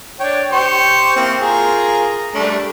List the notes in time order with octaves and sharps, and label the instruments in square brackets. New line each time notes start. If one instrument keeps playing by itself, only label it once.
[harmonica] D4 C#5 G5
G4 C5 C#6
A#3 C4 E4
F4 G#4 A#4
G3 A3 D4